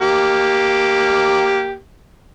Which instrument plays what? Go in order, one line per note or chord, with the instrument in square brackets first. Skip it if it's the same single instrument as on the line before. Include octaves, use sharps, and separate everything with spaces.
[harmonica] A#3 G4